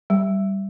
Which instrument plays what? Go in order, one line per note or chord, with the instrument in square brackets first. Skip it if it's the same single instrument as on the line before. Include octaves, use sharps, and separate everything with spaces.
[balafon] G3